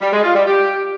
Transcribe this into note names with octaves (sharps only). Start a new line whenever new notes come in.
G3
G#3
F4
G3
G4